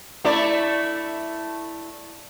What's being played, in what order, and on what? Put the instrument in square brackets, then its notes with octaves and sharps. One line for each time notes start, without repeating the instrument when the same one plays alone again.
[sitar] A3 E4 D5